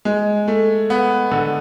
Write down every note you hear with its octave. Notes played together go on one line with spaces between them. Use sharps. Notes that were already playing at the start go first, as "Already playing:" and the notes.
G#3
A3
B3
D3